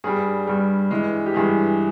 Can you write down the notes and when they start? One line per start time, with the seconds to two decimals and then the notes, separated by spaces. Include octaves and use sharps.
0.04 G2 G3 G#4
0.47 G2 G3
0.91 G2 E3 G#3
1.26 G4
1.34 G2 E3 G#3 G#4